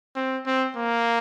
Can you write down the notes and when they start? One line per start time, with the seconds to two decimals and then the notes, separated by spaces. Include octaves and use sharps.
0.16 C4
0.47 C4
0.76 A#3